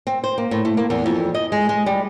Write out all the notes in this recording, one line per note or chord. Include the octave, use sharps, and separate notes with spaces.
C4
C5
A#3
A2
A3
A#3
E2
F2
D#5
G#3
G#3
G3